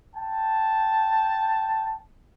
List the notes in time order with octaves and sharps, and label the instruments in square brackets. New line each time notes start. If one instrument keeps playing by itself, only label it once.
[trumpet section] G5 A5